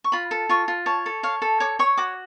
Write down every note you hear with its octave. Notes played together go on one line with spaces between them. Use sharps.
C#6
F4 B5
A4
F4 C#6
F4
C#5 A5
A4
C#5 F5
A4
C#5 D6
C#5 C#6
F#4 D6